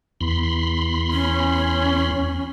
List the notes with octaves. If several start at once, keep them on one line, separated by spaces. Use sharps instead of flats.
E2 B5 C6
C#4